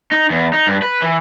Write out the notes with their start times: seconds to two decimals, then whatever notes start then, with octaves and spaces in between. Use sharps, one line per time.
0.12 D#4
0.30 E2
0.53 D#4
0.67 G2
0.82 B4
1.02 E3